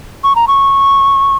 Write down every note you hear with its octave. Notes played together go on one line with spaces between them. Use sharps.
C#6
A#5
C#6